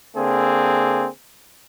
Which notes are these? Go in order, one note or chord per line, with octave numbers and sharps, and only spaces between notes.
D3 A#3 C4 G#4